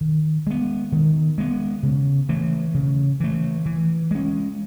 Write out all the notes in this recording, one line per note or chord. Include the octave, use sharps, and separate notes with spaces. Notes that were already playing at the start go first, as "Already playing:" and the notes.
D#3
G#3 B3
D#3
G#3 B3
C#3
E3 A3
C#3
E3 A3
E3
G#3 C#4